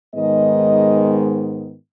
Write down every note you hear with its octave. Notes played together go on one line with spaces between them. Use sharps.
G#2 D#3 G#3 B3 D#5